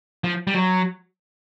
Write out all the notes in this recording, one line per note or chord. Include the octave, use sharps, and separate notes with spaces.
F3
G3
F#3